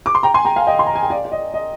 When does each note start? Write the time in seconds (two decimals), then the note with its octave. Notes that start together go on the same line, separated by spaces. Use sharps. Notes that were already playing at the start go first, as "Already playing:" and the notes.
0.06 D6
0.15 C6
0.23 G5 A#5
0.34 G#5 C6
0.45 G5 A#5
0.56 F5 G#5
0.67 D#5 G5
0.79 C6
0.87 A#5
0.95 G#5
1.03 G5
1.10 D5 F5
1.25 D5
1.32 D#5
1.54 D#5